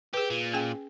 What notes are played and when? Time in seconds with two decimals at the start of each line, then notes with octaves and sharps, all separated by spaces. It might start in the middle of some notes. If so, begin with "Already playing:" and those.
0.14 G4 G#4 B4
0.30 A#2
0.54 C#4 G#4 G5